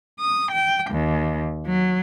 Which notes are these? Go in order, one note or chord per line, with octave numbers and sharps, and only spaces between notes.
D#6
G5
D#2
F#3